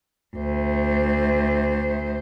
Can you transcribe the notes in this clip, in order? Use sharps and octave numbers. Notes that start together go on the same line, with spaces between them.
D2 C5